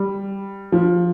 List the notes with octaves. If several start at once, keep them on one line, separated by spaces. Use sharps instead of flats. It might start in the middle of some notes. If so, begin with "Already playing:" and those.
Already playing: G3
F3